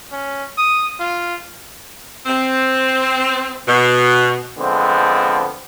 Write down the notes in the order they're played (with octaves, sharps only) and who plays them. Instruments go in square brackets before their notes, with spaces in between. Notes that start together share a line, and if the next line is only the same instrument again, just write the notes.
[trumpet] C#4
D#6
F4
[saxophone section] C4
B2
[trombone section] D3 F3 G#3 B3 C4